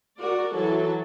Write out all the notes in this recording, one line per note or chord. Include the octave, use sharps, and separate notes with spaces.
F#4 A#4 D5
E3 F#3 A4